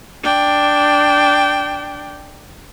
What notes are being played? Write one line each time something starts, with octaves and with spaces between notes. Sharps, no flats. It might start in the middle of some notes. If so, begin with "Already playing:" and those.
D4 G5